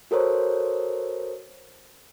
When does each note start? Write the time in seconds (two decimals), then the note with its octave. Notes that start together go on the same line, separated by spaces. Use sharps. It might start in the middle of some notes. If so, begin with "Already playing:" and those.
0.11 F#4 A4 A#4 C5 C#5